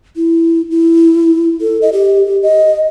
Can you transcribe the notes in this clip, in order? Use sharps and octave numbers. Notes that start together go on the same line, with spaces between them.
E4
E4
A4
D#5
G4
G4
D#5